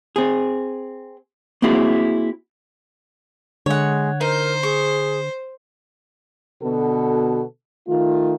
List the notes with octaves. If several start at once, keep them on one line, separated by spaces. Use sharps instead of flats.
C4 G#4
A#3 C4 E4 F#4 G#4
D3 G#3 C#5 F#5
D#4 A#4 C5
G#4 C#6
B2 D3 B3 F#4 A4
D#3 A3 F4